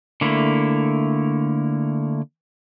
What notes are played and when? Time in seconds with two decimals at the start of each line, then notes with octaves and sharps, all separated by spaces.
0.21 D3 A3 A#3 E4